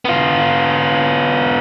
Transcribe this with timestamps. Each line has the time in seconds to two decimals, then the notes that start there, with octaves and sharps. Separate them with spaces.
0.05 B3 F4